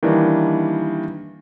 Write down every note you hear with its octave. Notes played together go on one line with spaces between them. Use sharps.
D#3 E3 G3 A#3 D4